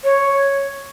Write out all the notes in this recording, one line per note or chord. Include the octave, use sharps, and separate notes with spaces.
C#5